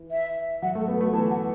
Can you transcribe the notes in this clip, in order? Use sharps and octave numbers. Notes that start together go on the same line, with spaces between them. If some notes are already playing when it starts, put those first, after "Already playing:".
Already playing: E3
E5
F#3 F#5
A3 A4
B3
B4
A3
E3 A5
F#5